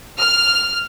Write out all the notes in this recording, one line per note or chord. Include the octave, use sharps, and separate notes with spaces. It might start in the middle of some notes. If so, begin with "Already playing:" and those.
F6